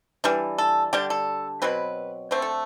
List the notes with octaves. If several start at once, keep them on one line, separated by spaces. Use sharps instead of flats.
E3 G3 D4
A4
D3 G3 D4 G4
A4
B2 F#3 C4 B4
D3 A3 C4 C5
A4